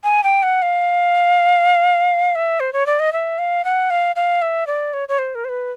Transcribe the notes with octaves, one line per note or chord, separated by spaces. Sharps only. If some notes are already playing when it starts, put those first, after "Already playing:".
G#5
G5
F#5
F5
E5
C5
C#5
D5
D#5
E5
F5
F#5
F5
F5
E5
D5
C#5
C#5
C5
A#4
C5
B4